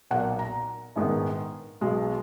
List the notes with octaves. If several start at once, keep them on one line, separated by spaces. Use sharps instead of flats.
B1 A#2 A#3 F#5
A#5
A#1 G#2 D#3 G#3 B3
B1 B2 G#3